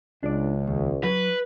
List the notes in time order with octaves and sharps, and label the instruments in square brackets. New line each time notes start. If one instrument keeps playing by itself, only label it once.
[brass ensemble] C#2 [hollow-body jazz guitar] D4 D5
[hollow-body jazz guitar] D#2
[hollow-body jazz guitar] F#3 [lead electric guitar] B4